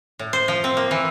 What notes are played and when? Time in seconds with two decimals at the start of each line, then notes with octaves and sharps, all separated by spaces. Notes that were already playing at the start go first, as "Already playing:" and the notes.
0.19 A2
0.33 C5
0.48 F3
0.64 C4
0.77 A#3
0.91 E3